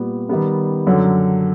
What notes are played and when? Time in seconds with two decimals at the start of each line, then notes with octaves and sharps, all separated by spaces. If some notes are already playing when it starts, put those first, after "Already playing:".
Already playing: A#2 G3 B3
0.29 D#3 G3 B3
0.87 F#2 D3 F#3